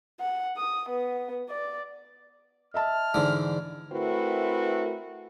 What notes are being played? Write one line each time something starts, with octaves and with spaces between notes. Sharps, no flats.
F#5
D#6
B3
D5
D#5 E5 A5 F6
G#2 D3 E3
A3 C4 E4 F#4 A#4 B4